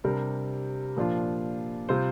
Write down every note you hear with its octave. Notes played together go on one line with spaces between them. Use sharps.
C3 G3 D4 A#4
A#2 F3 D4 F4
C3 G3 C4 F4 C5